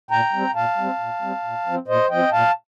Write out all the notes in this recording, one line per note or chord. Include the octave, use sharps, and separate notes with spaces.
A#2 G5 A#5
G3 C4
A#2 F5 A5
G3 C4
A#2
G3 C4
A#2
F3 C4
A#2 C5 D#5
F3 C4 D#5 G5
A#2 F5 A5